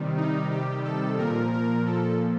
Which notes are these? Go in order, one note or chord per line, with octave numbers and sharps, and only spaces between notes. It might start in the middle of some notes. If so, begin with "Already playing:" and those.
Already playing: C3 D#3 G3
D#4
G4
A4
A#2 F3 A#4
A#4
A4